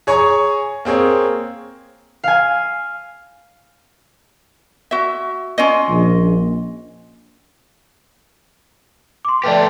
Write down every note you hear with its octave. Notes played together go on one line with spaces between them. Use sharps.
G#4 C#5 G#5 A#5 C#6
A#3 C4 G#4 C#5
F5 G#5
F#4 E5
C#4 F4 D#5
A#1
C6 D6
A3 G4 B4 D5